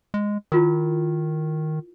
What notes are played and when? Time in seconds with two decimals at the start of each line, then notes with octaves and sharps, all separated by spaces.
0.14 G#3
0.52 D#3 E4 F4 A#4